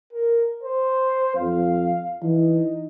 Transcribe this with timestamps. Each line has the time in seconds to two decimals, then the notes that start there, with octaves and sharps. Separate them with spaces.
0.13 A#4
0.63 C5
1.36 F2 F5
2.23 E3 D#4